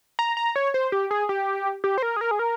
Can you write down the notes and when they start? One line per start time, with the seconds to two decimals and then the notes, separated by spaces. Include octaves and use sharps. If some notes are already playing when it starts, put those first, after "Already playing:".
0.19 A#5
0.37 A#5
0.56 C#5
0.74 C5
0.92 G4
1.11 G#4
1.29 G4
1.84 G4
1.98 C5
2.03 A#4
2.17 G#4
2.21 A#4
2.31 G#4
2.39 A#4